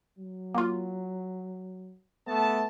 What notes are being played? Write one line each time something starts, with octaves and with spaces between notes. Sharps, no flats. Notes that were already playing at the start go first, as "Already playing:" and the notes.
F#3
A#3 F4
A3 B3 A5